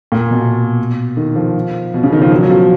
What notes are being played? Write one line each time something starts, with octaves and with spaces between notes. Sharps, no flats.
A#2
B2
D#3
F3
B2
C#3
D#3
F3
F#3
F#3
F3